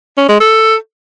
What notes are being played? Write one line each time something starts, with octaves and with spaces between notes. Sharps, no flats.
C#4
G#3
A4